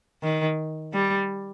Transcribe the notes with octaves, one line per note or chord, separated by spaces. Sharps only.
D#3
G3